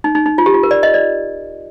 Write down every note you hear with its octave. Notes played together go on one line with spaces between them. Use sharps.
D#4
D#4
D#4
F4
G4
F4
A#4
D5
D#5
D5